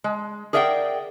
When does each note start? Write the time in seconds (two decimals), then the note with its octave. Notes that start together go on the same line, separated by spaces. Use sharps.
0.04 G#3
0.53 G#4 A#4 D5 E5 F#5 G5